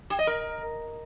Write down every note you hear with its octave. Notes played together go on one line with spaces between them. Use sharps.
G4
D#5
A#4